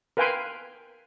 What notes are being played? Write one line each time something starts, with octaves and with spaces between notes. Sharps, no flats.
A#4 B4 F5 G5 G#5 C6